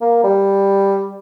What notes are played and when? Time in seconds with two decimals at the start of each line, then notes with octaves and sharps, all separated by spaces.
0.01 A#3
0.23 G3